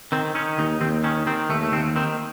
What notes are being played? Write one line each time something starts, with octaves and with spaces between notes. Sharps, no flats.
D#3 C4
D#3 C#4
D#2 D#4
D#2 C4
D#3 C#4
D#3 C4
D#2 A3
A3
D#2 C4
D#3 C4